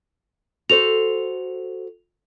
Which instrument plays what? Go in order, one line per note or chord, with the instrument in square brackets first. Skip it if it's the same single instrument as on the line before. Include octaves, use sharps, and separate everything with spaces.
[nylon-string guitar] F#4 A4 C5 [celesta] F7